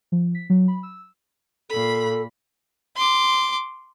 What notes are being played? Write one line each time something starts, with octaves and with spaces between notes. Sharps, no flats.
F3
B6
F#3
B5
E6
A#2 A4 B5
C6 D6